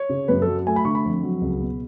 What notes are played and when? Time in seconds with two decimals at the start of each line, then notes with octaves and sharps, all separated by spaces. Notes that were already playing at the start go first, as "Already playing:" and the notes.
Already playing: C#5
0.09 C#3
0.28 F#2 B4
0.42 A4
0.47 F#3
0.67 A3 G#5
0.76 B5
0.85 D3 C#6
0.95 B5
1.05 F2
1.23 F#3
1.42 C#2
1.60 B2